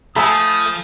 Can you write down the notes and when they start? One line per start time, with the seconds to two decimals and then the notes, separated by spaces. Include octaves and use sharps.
0.16 F3 A3 G#5 A5 B5 D#6